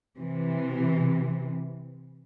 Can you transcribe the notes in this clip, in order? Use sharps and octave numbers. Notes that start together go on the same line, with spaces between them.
C3 E3